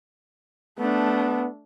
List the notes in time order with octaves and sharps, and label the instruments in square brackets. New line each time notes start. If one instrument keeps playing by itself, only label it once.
[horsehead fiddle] A3 D4 [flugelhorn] B3